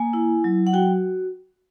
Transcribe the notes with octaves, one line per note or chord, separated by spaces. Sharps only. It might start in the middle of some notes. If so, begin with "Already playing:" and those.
Already playing: A#3 G#5
E4
F#3
F#5
F#4 G5